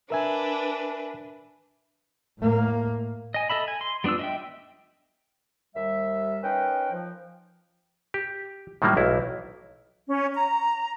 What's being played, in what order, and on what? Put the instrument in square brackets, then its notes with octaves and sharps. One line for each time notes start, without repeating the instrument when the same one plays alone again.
[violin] D4 B4 [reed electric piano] A#4 E5 G#5
[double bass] A2 A#3
[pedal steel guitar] D#5 G#5
A4 D#5 E5 B5
G#5
C6
G3 B3 D4 F4 E6
D#5 E5 G5
[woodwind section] D#2 G3 E5
C#4 D#4 A#4 B4 G5
F3
[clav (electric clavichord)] G4
A2 D#3 F#3 G3 A#3
B1 E4
[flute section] C#4
A#5